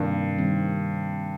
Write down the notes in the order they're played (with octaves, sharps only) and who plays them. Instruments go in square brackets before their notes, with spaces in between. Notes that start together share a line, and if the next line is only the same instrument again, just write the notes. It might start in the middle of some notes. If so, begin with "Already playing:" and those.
Already playing: [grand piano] G2 [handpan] C3 D#3 A#3
[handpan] D#3 G3 C4